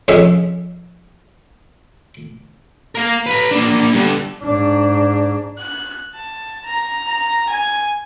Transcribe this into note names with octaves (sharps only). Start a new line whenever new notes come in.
F2 C#3 G#3 C#4 E5
A#4 F5
B4 A#5
A#3 D4
G2 D3
G#2 D4
F#6
A5
A#5
A#5
G#5